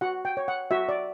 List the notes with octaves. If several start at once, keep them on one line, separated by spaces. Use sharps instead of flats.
F#4 F#5
G5
C#5
F#5
F#4 E5
D5